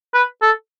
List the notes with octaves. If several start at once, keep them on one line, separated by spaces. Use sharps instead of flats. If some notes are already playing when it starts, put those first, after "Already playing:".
B4
A4